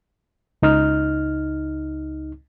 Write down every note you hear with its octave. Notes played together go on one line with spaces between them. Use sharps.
C#2 D#4 F6